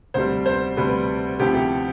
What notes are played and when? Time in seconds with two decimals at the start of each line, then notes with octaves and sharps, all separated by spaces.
0.14 D2 C3 G3 C5
0.46 C5
0.77 D2 C3 G3 B4
1.40 D2 C3 F3 C4 E4 G4
1.55 G4